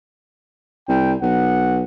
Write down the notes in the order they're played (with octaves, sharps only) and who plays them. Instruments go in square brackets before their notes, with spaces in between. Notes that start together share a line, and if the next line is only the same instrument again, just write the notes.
[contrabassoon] C2 [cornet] G5
[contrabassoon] B1 [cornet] F#5